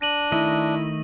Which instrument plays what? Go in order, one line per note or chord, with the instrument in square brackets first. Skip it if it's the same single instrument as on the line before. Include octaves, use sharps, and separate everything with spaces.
[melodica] D4 [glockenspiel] A#6 D#7 F#7
[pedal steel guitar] D#3 A3 D#5 [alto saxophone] E4